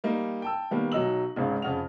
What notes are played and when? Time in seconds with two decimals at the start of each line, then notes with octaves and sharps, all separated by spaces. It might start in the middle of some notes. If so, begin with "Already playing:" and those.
0.04 G3 A#3 D#4
0.42 G5 A5 E6
0.71 D#3 G3 A#3 B3
0.92 B1 F#3 D#4 D#5 E6 F#7
1.36 G#1 C#2 C#3
1.62 F2 C#3 F#5 F7